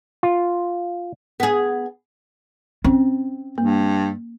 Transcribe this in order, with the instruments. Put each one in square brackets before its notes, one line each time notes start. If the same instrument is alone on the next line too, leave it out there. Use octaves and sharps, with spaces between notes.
[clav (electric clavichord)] F4
[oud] B3 G#4
[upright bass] C4 [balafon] C#4
[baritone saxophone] G2 [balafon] A#3